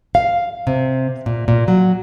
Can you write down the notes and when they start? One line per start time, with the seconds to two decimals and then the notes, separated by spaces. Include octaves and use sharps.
0.15 F5
0.67 C3
1.26 A#2
1.48 A#2
1.68 F#3